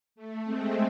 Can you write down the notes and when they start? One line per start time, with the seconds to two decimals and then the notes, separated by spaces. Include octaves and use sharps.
0.15 A3
0.44 G#3 C4